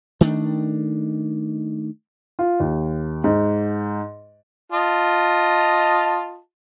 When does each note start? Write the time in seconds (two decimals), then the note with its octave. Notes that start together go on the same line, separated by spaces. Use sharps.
0.21 D#3 A3 C#4 D4
2.39 F4
2.60 D#2
3.24 G#2
4.72 F4 D#5 A5